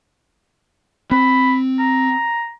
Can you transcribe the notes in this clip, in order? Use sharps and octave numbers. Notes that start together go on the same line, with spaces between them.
C4 B5
A#5